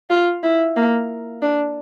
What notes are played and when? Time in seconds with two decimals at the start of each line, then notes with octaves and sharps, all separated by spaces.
0.10 F4
0.43 E4
0.77 A#3
1.42 D4